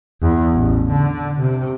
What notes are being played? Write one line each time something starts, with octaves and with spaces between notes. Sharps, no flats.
E2
A1
D3
C3